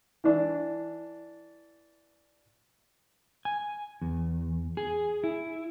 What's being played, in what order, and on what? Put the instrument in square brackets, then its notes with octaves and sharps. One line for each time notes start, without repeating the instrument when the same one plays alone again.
[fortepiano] E3 D4
[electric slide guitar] G#5
E2
G#4
E4